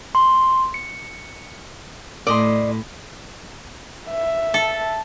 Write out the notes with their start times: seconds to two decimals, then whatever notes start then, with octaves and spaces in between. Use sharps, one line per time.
0.15 C6
0.74 C#7
2.27 A2 D5 D#5 C6
4.10 E5
4.54 A4